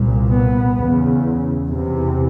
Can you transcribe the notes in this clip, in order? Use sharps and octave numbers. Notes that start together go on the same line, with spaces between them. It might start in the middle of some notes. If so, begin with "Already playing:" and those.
Already playing: C2 A#2
B3
E2 C#3
E2 C3